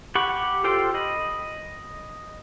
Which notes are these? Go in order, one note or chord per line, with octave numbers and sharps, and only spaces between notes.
G4 F#5 B5 C#6
F4 G4 A4 C5 G5
D#5 B5